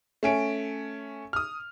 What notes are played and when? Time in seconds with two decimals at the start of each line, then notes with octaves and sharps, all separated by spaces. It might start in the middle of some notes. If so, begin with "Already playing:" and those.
0.23 A3 C#4 D7
1.33 D#6 F6